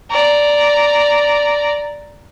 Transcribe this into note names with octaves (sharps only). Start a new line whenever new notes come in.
D5 A#5